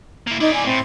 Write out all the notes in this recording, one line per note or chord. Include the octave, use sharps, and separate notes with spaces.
A#3 E4
D#4 E4 D5
G#5
A2 C4